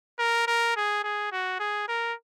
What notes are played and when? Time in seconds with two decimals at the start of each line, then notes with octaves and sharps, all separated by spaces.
0.19 A#4
0.47 A#4
0.76 G#4
1.03 G#4
1.32 F#4
1.60 G#4
1.88 A#4